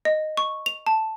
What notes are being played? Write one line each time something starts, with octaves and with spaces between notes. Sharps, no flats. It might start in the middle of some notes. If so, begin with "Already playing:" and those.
D#5
C#6
F7
A5